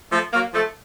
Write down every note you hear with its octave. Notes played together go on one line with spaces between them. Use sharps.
F3 A3
F#3 A#3
F3 A3